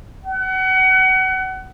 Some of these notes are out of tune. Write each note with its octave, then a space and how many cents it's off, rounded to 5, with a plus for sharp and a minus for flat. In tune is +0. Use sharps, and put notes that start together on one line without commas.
F#5 +30